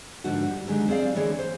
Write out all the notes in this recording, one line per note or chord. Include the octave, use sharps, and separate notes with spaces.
G#2 D3 F3 A#3 F#4
G3
D3 D#3 F#3 G#3 G4
C4 G#4 C5 D5 F5
D3 E3 A#3 G#4 C#5
C5